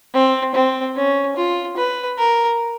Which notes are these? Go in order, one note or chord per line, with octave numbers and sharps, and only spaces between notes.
C4
C4
C#4
F4
B4
A#4